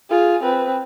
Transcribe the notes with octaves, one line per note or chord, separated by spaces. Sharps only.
F4 G#4
C4 B4